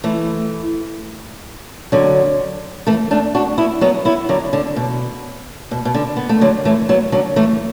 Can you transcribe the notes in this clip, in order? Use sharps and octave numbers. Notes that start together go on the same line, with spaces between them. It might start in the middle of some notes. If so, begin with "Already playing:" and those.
E3 A3
D3 F#3
E3 A3
A3 D4
D4 F#4
B3 E4
F#3 B3
B3 E4
D3 F#3
D3
B2
B2
B2
D3
B3
A3
D3 F#3
E3 A3
F#3 B3
D3 F#3
E3 A3